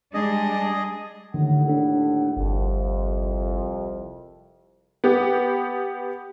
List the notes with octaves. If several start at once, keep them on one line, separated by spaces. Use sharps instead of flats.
G3 G#3 D4 G#4 D#5
D#2 A2 D3 D#3 F#5
D4 A4
G1 C2 F2
B3 G4